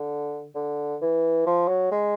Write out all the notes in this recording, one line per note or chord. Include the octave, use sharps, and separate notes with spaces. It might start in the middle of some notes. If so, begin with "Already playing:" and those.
Already playing: D3
D3
E3
F3
F#3
G#3